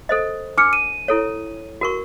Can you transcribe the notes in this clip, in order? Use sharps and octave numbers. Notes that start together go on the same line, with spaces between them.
A4 C5 D#5
D4 D6 F6 C#7
D#7
E4 A4 C#5
F#4 A#4 C#6